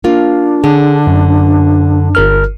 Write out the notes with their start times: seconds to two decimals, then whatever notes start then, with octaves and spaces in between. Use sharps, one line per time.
0.04 A#3 D4 F4
0.64 D3 G#4
1.07 F#2
2.15 G1 A#4 F6